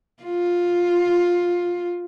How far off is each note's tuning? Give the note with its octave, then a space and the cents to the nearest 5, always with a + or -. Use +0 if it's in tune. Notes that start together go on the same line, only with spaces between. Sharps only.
F4 +10